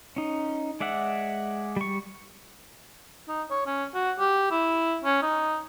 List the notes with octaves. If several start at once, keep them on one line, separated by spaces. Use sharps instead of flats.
C#4 D#4
G#3 D5 E5 F#5
G3 C#6
D#4
C#5
C#4
F#4
G4
E4
C#4
D#4